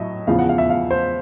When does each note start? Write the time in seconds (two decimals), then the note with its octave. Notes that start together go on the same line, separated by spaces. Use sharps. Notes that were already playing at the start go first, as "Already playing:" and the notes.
Already playing: A2 F#3 D#5 E5
0.27 E2 C#3 F3 F5
0.39 F#5
0.49 F5
0.58 E5
0.70 F5
0.91 C5